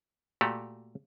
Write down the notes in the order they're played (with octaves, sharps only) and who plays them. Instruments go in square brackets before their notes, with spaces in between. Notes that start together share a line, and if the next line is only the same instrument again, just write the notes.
[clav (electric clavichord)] A#2 A3 F#4 G4